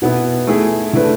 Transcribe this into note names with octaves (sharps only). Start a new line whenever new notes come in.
B2 B3 E4
A3 E4 G#4
D3 A3 E4 B4